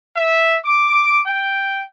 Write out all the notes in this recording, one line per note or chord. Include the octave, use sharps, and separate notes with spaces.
E5
D6
G5